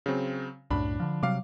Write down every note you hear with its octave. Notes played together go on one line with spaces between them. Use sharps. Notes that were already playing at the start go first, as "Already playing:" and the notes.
C#3 F#3 C4
C2 F#2 A2 D4 B5
D3 F3
C3 F#3 G3 F5 D6